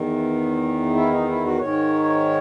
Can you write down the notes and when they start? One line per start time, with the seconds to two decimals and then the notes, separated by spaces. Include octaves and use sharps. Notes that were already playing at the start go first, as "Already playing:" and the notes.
Already playing: E2 D#3
0.95 E4
1.11 D#4
1.28 E4
1.44 F#4
1.60 G#2 D#3 C#5